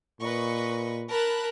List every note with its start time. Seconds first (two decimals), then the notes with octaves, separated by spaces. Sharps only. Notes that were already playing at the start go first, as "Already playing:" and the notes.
0.21 A#2 B4 D#5 C#6
1.10 A#4 A5 B5 F#6